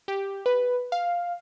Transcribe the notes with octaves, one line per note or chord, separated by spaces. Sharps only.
G4
B4
F5